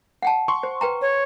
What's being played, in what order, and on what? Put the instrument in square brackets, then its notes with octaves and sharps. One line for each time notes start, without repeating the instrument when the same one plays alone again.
[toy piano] F#5 G5 A5
[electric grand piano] C6 C#6
[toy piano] C5
B4 G5 A#5
[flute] C#5